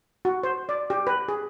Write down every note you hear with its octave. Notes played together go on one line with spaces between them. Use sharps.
F#4
C5
D5
G4
B4
G#4